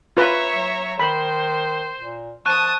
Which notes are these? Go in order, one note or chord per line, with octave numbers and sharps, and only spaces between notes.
F4 B4 C#5 E5 A#5
F#3
D#3 C5 B5
A#2
F3 A5 C#6 D#6 F#6 D#7